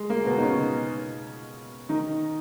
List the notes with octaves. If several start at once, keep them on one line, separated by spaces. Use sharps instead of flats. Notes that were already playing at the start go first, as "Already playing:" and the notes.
Already playing: G#3
A#3
B2 B3
D#4
C#3 C#4
D#3 D#4